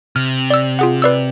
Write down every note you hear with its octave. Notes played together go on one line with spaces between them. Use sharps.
C3 F6
D5 E6
F4 G#4 F#5
B4 D5 E6